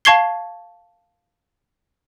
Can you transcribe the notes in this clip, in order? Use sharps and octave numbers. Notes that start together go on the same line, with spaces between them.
F5 A5 C#6 G#6 C7 G7